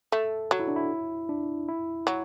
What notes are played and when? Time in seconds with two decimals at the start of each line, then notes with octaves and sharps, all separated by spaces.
0.12 A3 A4
0.51 F#3 F#4
0.59 E4
0.68 D4
0.76 E4
1.29 D4
1.69 E4
2.07 F#3